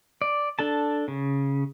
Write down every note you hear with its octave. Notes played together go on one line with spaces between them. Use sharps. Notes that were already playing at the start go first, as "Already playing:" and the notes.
D5
D4 A4 A5
C#3